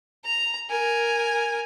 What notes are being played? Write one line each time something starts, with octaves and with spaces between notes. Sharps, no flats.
A#5
A#4 G#5